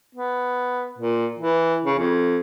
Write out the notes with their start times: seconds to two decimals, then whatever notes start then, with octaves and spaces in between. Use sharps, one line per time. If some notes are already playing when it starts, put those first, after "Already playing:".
0.15 B3
0.98 A#2
1.39 E3
1.85 C#3
1.99 F2